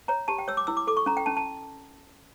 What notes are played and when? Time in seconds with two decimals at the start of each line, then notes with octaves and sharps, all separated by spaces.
0.08 C#5 A#5
0.28 G4 A5
0.39 G5
0.48 C#5 E6
0.57 D6
0.67 E4 E6
0.77 D6
0.87 A4 D6
0.97 C#6
1.06 C#4 A#5
1.17 G5
1.26 C#4 A5
1.37 A5